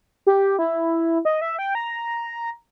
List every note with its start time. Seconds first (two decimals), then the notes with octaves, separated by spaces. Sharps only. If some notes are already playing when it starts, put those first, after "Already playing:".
0.27 G4
0.59 E4
1.25 D#5
1.41 E5
1.59 G5
1.75 A#5